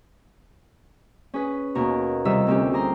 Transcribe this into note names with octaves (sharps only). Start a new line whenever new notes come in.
C#4 G#4 B4
D#2 B2 A#4 C#6
C3 D#3 G3 F4 E5 E6
D2 C4 C#4 G4
G4 G#4 A#5 C6